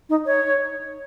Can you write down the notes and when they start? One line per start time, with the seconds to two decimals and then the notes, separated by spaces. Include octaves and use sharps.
0.09 D#4
0.26 C#5